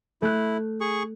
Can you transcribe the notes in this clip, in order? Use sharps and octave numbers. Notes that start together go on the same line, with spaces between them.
A3 E4 F#6
G#4 C#6